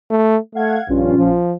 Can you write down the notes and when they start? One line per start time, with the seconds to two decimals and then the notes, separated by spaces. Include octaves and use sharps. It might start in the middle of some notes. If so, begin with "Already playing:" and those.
0.10 A3
0.55 A3 F5 F#5 G#6
0.88 A#1 G2 C#4 F4
1.18 F3